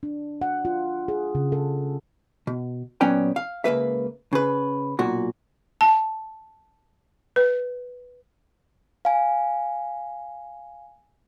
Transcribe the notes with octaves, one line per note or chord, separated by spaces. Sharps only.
D4
F#5
F4
G#4
C#3
A4
B2
A#2 F#3 B3 C#4 D5 G5
F5
C#2 A#3 B4 E5
C#3 B4
B1 A#2 F#4
A5
B4
F5 G#5